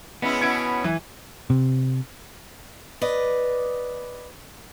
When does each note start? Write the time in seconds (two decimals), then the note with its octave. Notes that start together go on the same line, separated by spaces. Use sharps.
0.22 G#3 B3 C#4 E4
0.41 B2 C#4 E4 G#6 C#7 D7
0.84 E3
1.50 C3
3.02 B4 D5 D#5